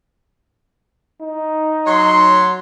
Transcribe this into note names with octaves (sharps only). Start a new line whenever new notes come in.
D#4
F#3 C#5 C6